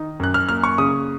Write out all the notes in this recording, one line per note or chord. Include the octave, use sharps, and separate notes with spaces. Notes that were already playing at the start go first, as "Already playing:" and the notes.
Already playing: D#3 D#4
F#2 F#6
F6
A#3 F6
C#6
C#3 D#6